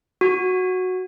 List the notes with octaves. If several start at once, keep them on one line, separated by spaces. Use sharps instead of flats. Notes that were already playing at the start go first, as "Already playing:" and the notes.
F#4